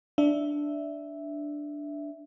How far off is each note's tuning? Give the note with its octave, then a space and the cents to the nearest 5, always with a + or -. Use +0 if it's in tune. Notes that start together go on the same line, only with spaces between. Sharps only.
D4 +0 E5 +0